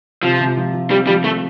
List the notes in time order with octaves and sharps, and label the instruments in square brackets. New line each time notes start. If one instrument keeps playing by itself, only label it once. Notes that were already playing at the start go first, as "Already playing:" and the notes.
[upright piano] C3 [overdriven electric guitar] F3
[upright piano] C3
F3
F3
[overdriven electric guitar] G3 [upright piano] C4
[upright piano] F3 [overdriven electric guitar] G3
[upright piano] F3 [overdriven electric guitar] A3